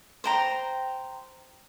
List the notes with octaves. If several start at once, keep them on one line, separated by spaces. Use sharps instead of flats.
C5 G5 A#5